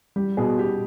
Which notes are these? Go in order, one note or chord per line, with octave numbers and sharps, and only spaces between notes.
G3 G4
B2 G#4
B2 G4